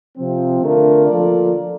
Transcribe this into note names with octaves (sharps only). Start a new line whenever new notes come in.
C3 F3 C4
D3 A3 D4 F4 A#4
F3 A#3 F4 A4 D5